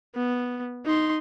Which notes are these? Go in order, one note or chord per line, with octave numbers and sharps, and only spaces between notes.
B3
D#4 C6